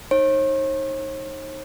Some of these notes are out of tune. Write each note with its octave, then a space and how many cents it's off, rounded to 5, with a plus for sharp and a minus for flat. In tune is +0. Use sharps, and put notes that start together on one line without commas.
D#4 +0 C#5 -45